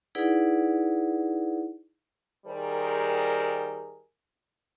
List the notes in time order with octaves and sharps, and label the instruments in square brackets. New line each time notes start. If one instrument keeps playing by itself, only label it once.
[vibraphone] D#4 E4 G#4 B4 D5 F#5
[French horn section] D#3 G3 G#4 A#4 C5